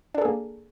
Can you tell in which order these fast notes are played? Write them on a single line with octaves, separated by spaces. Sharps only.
D4 A4 G#4 A#3